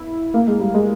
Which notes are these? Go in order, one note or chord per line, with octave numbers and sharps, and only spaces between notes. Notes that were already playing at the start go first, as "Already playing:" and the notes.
Already playing: E4
A#3
G#3
G3
G#3